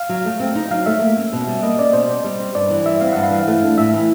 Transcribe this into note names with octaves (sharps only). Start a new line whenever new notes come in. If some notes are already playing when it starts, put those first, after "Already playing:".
Already playing: F5
F#3
A3
C4
D#4
F#3 F5
A3 E5
A#3
C#4
B2
G3
A#3 D#5
C#4 D5
B2 C5
G3
G3
C4
G2 D5
E3
G3 E5
C4 F5
G2 F#5
F5
E3
A3
D4
A2 E5
E3